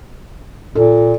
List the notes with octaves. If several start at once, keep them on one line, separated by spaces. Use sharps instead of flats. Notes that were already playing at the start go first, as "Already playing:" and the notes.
A#2 A4